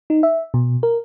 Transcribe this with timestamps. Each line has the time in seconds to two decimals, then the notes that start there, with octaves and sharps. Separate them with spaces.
0.10 D#4
0.23 E5
0.54 B2
0.83 A#4